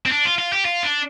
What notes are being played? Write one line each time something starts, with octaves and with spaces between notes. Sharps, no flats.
C4
D4
F4
F4
G4
F4
D4